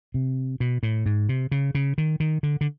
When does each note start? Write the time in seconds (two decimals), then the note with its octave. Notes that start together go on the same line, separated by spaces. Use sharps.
0.14 C3
0.60 B2
0.83 A2
1.06 G#2
1.29 C3
1.52 C#3
1.75 C#3
1.98 D#3
2.20 D#3
2.43 D3
2.61 D3